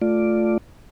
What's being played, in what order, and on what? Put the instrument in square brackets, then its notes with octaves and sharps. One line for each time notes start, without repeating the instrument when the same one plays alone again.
[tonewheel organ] A3 F4 D5